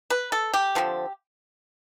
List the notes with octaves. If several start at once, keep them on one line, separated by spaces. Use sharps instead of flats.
B4
A4
G4
D3 F3 C4